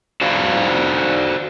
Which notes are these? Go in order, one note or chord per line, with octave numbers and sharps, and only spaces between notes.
F#4 C5 D5 F5